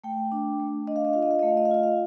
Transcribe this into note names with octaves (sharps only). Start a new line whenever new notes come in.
A3 G5
D4
A3
D4 D#5
F5
D#5
F4 F5
D#5
F5
A3 D#5
F5
D#5
F5
F4 D#5
F5